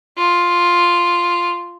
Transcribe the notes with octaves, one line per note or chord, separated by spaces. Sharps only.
F4